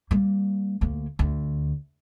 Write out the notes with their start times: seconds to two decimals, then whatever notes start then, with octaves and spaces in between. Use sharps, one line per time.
0.11 G3 A#3
0.81 D2 A#3
1.19 D2